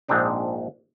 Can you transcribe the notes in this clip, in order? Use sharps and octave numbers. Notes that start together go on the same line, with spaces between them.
A#1 G#2 C4 D4 D#4